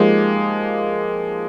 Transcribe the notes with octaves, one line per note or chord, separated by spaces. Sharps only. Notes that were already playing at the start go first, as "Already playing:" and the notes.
Already playing: F3 G#3 A#3 D#4 G4 C5